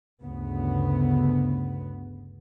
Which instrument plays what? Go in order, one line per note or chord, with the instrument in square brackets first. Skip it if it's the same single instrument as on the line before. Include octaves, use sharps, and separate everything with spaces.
[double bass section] G1 D2 C#3 B3